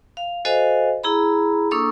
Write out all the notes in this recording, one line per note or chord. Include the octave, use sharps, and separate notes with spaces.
F5
F#4 A4 C5 D#5 F5 G#5
E4 G#4 A#5 B5
A#3 D4 A4 C#6 D#6 E6